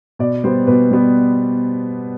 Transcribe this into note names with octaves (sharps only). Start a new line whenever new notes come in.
B2 D5
G3 B3 C5
B2 B4
G3 B3